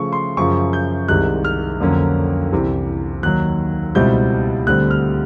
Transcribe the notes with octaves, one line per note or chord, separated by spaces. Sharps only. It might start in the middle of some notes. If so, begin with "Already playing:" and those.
Already playing: C#3 F3 A3 C#6
C6
F#2 C#3 F3 C#6
G6
C2 C3 D#3 G#3 F#6
F6
F2 D3 F#3 A#3 C#4
C2 C3 E3
D#2 D#3 F#3 F#6
C#2 B2 G3 C4 E4 G6
D2 D3 G3 C4 F#6
F6